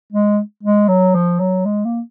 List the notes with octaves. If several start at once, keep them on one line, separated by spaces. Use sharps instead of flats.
G#3
G#3
F#3
F3
F#3
G#3
A#3